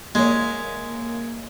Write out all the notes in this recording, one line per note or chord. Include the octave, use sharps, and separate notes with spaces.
G#3 A#3 C#5 D#5 E5